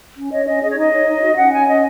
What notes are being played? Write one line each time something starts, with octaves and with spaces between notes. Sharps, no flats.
C#4
C#5 D#5
C#4 D#5
G#4 D#5
C#5
D#4 D#5
C#5
D#4
F#4
C#4 F#5
C#5 G#5
C#4 D#5